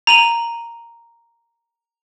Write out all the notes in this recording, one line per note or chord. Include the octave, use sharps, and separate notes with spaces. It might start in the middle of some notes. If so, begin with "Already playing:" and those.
A#5 D#7 F#7